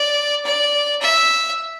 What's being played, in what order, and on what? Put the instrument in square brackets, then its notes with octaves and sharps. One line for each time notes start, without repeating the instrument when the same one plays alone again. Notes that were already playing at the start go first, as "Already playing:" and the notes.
Already playing: [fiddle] D5
D5
E5